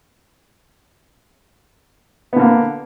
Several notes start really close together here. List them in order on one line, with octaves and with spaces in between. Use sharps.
B3 D3 A#3